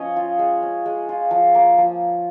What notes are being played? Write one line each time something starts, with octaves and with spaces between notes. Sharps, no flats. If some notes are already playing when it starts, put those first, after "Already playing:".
Already playing: F3 C#4 C#5 D#5
F4
G#3
C#4
G#3
F4
F3
A#3
F3